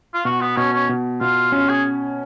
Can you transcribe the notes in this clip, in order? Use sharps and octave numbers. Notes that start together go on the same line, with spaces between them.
F4
B2 F#4
B3
B2 C#4
C#4
B2
B2 F4
C#4 F4
G#4